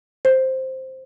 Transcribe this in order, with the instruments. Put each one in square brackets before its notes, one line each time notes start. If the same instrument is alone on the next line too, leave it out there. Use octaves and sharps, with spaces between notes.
[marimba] C5